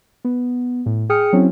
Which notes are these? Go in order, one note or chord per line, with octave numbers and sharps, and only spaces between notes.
B3
A2
G#4 G5 D#6 F6 C#7
F#3 C4 C#4 E4